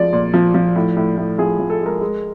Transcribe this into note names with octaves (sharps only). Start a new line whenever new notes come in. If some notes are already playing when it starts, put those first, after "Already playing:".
Already playing: F3 G#3 D5
A#2
F3
F3
A2
A2
A2
F3 G#4
F3
A4
G#3
A#4
G#3